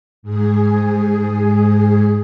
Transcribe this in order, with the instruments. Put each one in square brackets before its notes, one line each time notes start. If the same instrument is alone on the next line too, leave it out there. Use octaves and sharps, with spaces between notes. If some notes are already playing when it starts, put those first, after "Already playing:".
[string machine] G#2 G#4